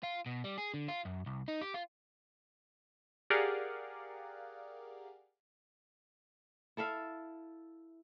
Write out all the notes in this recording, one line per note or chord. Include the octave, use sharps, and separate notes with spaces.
F4
B2
G3
G#4
D3
F4
F#2
C2
D#4
G4
F4
G4 G#4 A#4 D5 F5 F#5
E4 A4 E5 F5